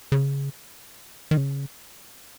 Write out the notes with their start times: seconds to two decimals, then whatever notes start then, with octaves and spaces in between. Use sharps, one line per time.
0.12 C#3
1.31 D#3
1.37 C#3